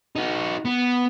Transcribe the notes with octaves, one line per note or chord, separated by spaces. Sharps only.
D#4 F#4
B3